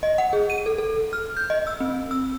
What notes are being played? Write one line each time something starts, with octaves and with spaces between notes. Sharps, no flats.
D#5
F#5
G#4
D#7
A4
A4
F6
G6
D#5
E6
C4
E6